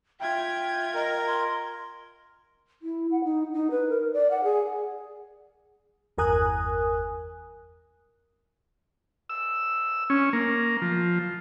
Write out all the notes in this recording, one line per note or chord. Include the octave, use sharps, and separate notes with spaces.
F4 E5 G5 G#6
A#4 D#5
C6
E4
F#5
D#4
D#4
B4
A#4
D5
F#5
G#4
G1 E2 A#4 G#5 D#6 F#6
E6
C#4
A#3
F3